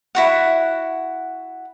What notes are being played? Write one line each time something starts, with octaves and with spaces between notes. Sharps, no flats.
E4 F#4 F#5